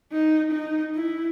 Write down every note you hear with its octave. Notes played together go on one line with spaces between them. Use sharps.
D#4
D#4
E4